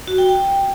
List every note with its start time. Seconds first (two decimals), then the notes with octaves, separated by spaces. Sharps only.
0.08 F#4
0.18 G5
0.29 G5